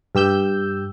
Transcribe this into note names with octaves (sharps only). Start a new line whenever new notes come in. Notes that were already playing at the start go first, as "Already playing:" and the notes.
G2 G4 E6 G6